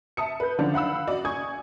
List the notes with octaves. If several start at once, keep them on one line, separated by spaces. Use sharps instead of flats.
E5 A5 D#6 C#7
B4 G6
D3 D#3 F3 D4 F4
F5 F#5 B5 E6
F#4 D5 D#5
D5 G#5 C#6 D#6 G#6